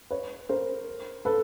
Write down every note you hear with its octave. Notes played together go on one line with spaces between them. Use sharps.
B4 C#5
A#4 C5
A4 B4